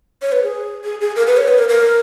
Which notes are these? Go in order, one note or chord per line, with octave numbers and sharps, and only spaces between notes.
C#5
B4
G#4
G#4
G#4
A#4
B4
C#5
B4
A#4
A#4